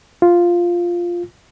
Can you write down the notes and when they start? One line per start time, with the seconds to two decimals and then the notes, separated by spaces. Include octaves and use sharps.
0.22 F4